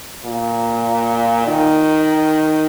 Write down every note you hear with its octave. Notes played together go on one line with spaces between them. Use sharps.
A#2
D#3